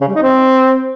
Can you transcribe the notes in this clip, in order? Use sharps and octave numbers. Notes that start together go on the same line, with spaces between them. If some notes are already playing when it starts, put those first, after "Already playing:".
C#3
G3
D#4
C4